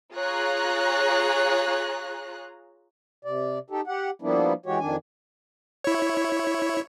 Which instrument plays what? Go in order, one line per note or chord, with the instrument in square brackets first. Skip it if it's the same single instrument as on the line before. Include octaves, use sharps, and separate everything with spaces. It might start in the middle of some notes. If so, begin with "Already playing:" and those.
[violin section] F4 G#4 C#5 A#5 F#6
[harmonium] C3 D5
D#4 G4 A4
G4 F#5
F3 G3 A#3 B3 D4 E4
E3 G#3 F#4 G4 C#5
F2 D#3 D4 G#5
[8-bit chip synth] E4 C#5